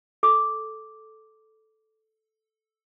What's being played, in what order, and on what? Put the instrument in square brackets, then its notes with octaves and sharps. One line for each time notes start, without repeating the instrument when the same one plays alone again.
[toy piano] A4 D6